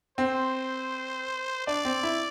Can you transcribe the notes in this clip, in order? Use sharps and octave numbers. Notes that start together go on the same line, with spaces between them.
C4 C5
D4 D5
C4
E4